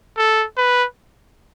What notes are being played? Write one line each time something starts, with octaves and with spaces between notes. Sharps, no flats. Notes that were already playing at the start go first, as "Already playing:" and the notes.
A4
B4